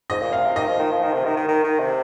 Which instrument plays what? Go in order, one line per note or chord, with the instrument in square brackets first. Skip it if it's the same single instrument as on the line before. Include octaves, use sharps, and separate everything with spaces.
[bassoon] G#2 [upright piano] D#5
[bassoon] A#2
[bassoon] C3 [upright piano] F5
[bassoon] C3
[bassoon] D#3 [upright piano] D#5
[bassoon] F3
D#3
F3
D#3
C3
D#3
D#3
D#3
D#3
C3